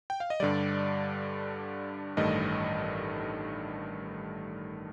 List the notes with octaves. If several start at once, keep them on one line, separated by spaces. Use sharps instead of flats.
G5
F5
D#5
G2 D3 G3 D5
A1 G2 D#3 A3 D#5